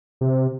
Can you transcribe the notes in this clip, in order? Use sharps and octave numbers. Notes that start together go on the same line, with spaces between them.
C3